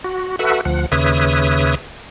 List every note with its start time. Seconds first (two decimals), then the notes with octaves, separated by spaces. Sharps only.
0.04 F#4
0.39 F#4 A4 B4 E5 F#5
0.65 D2 F3 F#5
0.92 D#2 C#3 B4 C#5 E5 D#6